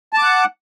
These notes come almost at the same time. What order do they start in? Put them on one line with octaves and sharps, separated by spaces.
A5 D6 F#5